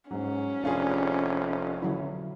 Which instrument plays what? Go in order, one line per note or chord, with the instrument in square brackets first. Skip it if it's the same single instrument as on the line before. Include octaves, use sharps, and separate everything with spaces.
[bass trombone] G#2 [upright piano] F#3 [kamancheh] C#4
[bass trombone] F1 [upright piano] D4 F4 G#4
[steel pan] D3 F#3 E4